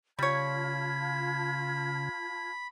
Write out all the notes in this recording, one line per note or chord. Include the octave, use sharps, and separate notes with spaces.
C#3 G3 F4 C#5 A5 B5 G#6